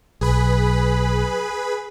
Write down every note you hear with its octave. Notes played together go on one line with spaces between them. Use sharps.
B1 G#4 B4 B5